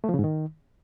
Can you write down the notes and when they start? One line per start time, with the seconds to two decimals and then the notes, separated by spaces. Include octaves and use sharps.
0.04 A3
0.09 F3
0.14 C#3
0.19 G#2
0.24 D#3